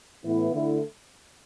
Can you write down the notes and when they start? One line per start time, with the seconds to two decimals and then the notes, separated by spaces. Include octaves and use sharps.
0.24 A2 E3 B3 E4
0.53 D3 A3 E4